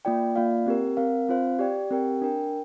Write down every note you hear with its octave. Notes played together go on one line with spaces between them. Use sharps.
A#3 F4 D5 G5
A#3 F4 D5 F5
C4 G4 A#4
C4 A#4 F5
C4 F4 C5 F5
G4 D5 G5
C4 G4 A#4 G5
D4 A#4 G5